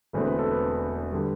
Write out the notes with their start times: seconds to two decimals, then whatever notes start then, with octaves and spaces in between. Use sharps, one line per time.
0.13 E1 E2 D3 A3 C4 B4
0.26 B4
0.39 A4
0.51 B4
1.12 D3 G3